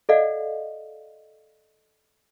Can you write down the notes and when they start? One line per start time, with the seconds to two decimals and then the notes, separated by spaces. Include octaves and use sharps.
0.09 A4 D5 D#5 F5 F#5